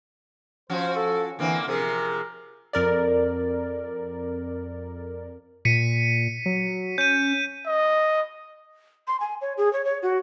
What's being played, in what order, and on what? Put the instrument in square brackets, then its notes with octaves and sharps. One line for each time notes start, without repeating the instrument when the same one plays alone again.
[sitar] F3 C#4 F#4 [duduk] C5
[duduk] A4
[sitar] D3 A#3 C4 [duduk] E3
[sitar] C3 F3 G#4 [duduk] A#4
[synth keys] F2 A#4 D5
[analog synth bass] A#2 [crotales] B6 C#7 D#7
[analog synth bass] F#3
[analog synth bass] C#4 [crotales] G6 D#7
[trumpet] D#5
[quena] C6
G#5
C#5
G#4
C#5
C#5
F#4